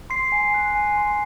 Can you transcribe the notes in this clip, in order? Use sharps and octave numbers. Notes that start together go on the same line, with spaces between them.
C6 C7
G#5
F#6
G#5
C6